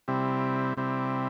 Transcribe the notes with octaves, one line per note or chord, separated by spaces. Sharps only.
C3 G3 C4 E4
C3 G3 C4 E4